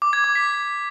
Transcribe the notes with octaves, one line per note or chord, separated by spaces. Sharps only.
D6
G#6
D6
B6